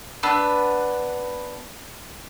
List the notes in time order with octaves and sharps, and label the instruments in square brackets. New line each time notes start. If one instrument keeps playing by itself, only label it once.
[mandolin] B3 D4 B4 E6